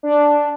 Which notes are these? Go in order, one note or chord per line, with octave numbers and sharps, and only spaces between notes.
D4